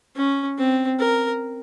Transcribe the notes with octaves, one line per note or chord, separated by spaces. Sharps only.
C#4
C4
A#4